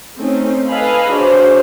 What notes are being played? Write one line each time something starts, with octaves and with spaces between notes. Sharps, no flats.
A3 C4 C#4 D#4
A4 B4 D#5 F5 G#5 B5
D4 F#4 G#4 C5 C#5